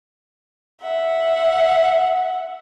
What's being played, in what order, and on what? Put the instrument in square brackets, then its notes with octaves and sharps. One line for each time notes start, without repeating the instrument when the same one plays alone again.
[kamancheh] E5 F#5